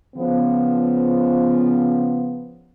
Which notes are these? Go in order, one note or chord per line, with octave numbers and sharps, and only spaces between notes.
C#3 F3 B3